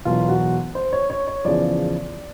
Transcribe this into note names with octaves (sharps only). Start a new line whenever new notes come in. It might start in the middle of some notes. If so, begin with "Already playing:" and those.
E1 E2 B2 F#3 F4
F#4
C5
C#5
C#5
C#5
E2 C#3 F3 D5